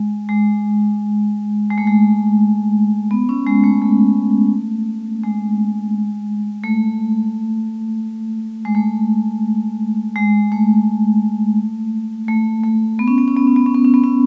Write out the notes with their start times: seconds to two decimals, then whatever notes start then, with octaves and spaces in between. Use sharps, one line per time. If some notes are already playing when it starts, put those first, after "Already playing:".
Already playing: G#3
0.29 G#3
1.71 G#3
1.78 A3
1.87 G#3
3.11 B3
3.29 C#4
3.47 G#3
3.64 A3
3.82 A3
5.23 G#3
6.63 A3
8.65 G#3
8.75 A3
10.16 G#3
10.52 A3
12.28 A3
12.64 A3
12.99 B3
13.08 C#4
13.18 B3
13.28 C#4
13.37 B3
13.47 C#4
13.56 B3
13.66 C#4
13.75 B3
13.85 C#4
13.94 B3
14.04 C#4